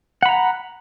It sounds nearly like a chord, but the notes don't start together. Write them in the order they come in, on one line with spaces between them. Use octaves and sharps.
F#5 B5 A#5